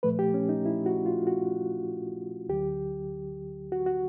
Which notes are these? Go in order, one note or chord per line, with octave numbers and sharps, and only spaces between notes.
A#2 F3 A3 B4
G4
C#4
D#4
E4
F#4
F4
F#4
D2 D3 F#3 G4
F#4
F#4